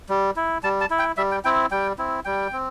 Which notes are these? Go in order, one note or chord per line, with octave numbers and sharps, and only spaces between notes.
G3
E4
G3 A5
A5
E4
G5
G3 E5
G5
C4 E4 G5
G3 G5
C4 E4
G3 G5
C4